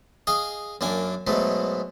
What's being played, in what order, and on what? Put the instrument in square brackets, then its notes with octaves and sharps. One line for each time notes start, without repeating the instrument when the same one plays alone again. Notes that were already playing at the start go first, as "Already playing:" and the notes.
[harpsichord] G#4 D#5 F5
F#2 A#3 D4 G#5
G#2 B2 F#3 A3